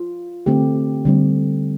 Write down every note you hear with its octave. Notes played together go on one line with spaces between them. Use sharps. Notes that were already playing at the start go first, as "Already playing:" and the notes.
Already playing: F4
D3 A3 C4 G4
D3 G3 C4